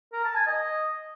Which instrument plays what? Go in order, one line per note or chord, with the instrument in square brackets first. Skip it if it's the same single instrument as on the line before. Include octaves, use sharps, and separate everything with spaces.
[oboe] A#4
A5
G#5
D#5